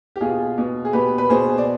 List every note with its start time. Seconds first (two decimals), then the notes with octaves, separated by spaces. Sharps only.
0.16 G4
0.21 B2 F4 G#4
0.58 B2
0.85 G#4
0.93 B2 G4 B4
1.18 B4
1.29 B2 G#4 C5
1.58 D5